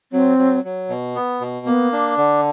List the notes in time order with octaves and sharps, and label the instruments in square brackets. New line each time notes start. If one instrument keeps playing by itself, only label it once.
[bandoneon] F#3 [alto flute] C4
[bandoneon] F#3
F#3
B2
B3
B2
[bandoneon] A#3 [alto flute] B3
[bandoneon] D4
D3